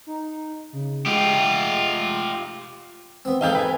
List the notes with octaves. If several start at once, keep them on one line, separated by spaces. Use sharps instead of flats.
D#4
C#3
G#3 F4 G4
B3 C4
G#2 D#4 A4 D#5 F5 G5
B4 G#5